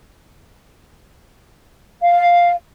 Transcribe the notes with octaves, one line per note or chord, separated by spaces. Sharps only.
F5